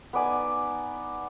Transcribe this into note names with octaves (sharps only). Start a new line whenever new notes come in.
B3 D#4 D5 G#5